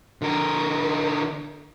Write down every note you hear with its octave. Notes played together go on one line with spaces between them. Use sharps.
D3 A#4